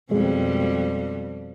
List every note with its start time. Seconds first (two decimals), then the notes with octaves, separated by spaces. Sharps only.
0.11 F2 B2 G3 G#3